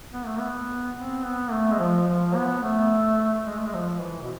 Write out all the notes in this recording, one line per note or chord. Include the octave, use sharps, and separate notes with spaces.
B3
A3
B3
C4
B3
A3
G#3
F3
F3
B3
A3
G#3
A3
G#3
F3
E3
B2